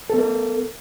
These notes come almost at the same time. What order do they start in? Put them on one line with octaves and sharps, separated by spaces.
A4 B3 A#4